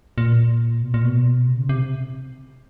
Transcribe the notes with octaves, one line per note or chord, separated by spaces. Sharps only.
A#2
B2
A#2
B2
C3
C#3
C3